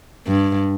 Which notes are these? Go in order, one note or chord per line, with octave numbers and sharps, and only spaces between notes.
G2